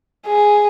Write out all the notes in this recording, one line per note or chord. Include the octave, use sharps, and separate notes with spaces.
G#4